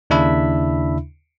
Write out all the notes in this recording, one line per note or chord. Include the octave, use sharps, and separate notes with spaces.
D#2 C#3 D4 E4 E5 B5